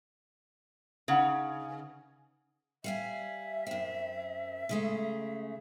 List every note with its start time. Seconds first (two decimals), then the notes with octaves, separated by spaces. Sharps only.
1.08 C#3 D#4 F#5
2.84 G3 E5 F5 G#5
3.67 F#2 C4
4.69 C#3 G#3 A3